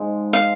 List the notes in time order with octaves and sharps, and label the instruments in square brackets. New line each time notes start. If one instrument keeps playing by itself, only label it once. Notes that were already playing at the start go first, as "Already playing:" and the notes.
Already playing: [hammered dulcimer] G#2 F3 G#3
[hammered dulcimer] F3 G#3 [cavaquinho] F5